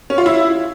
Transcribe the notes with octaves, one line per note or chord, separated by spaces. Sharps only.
C#4
F4
E4